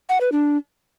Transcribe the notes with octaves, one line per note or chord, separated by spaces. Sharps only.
F#5
B4
D4